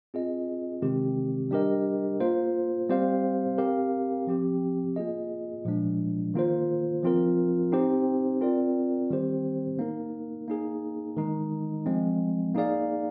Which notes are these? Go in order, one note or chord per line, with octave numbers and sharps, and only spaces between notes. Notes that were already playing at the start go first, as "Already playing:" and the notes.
C4 F4 G#4 D#5
C3 D#3 G#3 C4 G4
G3 D4 G4 A#4 D#5
A#3 F4 C5
G3 C4 G4 C5 F5
C4 G4 A#4 F5
F3 C4 G4
A#3 F4 G#4 D#5
A#2 F3 G#3 D4
D#3 A#3 F4 C5
F3 C4 F4 A#4
C4 D#4 G4 C5
C4 F4 A#4 D5
D#3 G3 C4 G4 C5
A#3 D#4 A#4
A#3 D#4 G#4
D#3 G#3 D#4
F3 G#3 C4
A#3 D#4 G#4 D5 F5